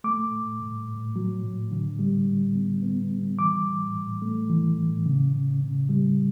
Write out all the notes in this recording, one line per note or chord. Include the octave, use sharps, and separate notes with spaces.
A3 D6
A2
A2
A2
F#3
A2
D3
G3
G3
B3
B3
G3
E3 D6
A2
A2
A3
E3
A2
C#3
C#3
C#3
G3